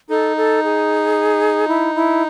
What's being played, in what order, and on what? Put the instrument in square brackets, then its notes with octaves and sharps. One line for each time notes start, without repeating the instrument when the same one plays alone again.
[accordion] D#4 [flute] A4
[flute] A4
G#4
E4
E4